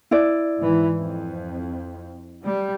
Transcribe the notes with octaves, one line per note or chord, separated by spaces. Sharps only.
E4 D5
G#2 E3
F2
G3